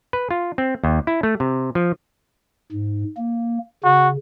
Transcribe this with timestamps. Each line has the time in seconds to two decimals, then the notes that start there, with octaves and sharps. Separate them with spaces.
0.13 B4
0.31 F4
0.58 C4
0.84 D#2
1.07 E4
1.23 A3
1.40 C3
1.75 F3
2.72 G#2
3.17 A#3
3.84 C#3 F#4